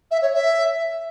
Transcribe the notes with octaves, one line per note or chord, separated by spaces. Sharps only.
E5
C#5
E5